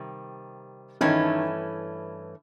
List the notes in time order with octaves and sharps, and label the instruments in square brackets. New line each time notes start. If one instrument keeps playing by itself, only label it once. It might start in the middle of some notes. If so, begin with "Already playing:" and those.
Already playing: [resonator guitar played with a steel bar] C3 D#3 G3
[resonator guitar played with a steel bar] G2 E3 A3 C#4 [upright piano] D#3 D#4